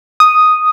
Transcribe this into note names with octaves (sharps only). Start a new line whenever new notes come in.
D#6